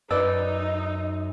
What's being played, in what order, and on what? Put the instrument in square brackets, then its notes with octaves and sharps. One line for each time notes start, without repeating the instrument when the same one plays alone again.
[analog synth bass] F#2 [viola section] D#4 [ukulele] B4 D5 [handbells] E6